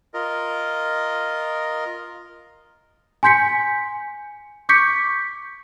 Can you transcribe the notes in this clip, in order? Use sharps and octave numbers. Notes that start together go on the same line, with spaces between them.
F4 A#4 D#5
G#5 C6 G6 B6 C#7
C#6 D6 G6 B6 C#7